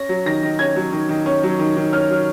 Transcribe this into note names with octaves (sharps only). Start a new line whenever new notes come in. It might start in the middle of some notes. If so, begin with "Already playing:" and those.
Already playing: C#4 A#6
F#3
D#3 A#6
D#3
C#4 G#6
F#3
D#3
D#3
C#4
F#3
D#3
D#3
C#4 F6
F#3